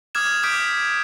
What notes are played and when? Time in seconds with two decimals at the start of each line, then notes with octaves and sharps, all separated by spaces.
0.15 D6 D#6 F6 G#6 E7
0.43 D6 D#6 F6 G6 B6 D7